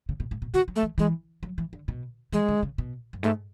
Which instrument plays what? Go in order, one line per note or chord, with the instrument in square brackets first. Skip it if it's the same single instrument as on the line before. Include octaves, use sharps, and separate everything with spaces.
[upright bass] C#3
B2
A2
B2
[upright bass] D3 [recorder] F#4
[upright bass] F#3
[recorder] A3
[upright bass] E3
[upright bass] E3 [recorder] G#3
[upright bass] F#3
E3
D3
B2
[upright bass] E3 [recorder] G#3
[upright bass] D3
C#3
B2
F#2
[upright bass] G#2 [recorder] A3